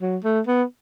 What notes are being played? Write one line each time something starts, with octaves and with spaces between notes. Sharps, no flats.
F#3
A3
B3